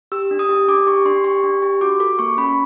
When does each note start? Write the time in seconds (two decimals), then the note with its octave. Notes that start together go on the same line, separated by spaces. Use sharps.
0.12 G4 E6
0.31 D4
0.39 D#6
0.49 G4
0.68 D4 D6
0.86 G4 C#6
1.06 D4 C6
1.24 G4 C#6
1.43 D4
1.62 G4
1.81 F#4 D6
2.00 A4 D6
2.19 A#3 C#6
2.38 C#4 B5